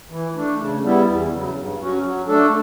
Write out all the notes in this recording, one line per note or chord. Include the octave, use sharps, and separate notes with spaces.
E3
A3 D4
C#3
G3 B3 E4
E2
C#3 F#3
G2
F#3 C#4 F#4
F#3
A3 D4 A4